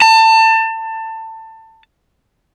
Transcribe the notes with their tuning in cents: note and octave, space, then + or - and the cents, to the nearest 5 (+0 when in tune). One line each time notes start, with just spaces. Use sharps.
A5 +25